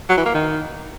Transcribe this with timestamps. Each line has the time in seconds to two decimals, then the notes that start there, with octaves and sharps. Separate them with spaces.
0.09 F#3
0.17 E3
0.26 A#3
0.34 D#3